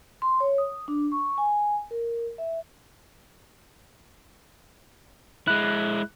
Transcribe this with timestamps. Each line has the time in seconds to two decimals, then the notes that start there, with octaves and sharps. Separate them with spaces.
0.22 C6
0.40 C#5
0.58 D#6
0.88 D4
1.12 C#6
1.38 G#5
1.91 A#4
2.38 E5
5.47 G#3 E4 F#6